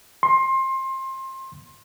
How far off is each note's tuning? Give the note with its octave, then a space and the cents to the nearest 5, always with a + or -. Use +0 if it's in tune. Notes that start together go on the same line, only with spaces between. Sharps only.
C6 +25